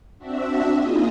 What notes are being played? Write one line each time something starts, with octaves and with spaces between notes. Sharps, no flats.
C4 D4 F#4 E5
A#3 D#4 F4 G#4 D#5